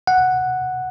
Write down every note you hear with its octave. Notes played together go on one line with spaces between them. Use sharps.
F#5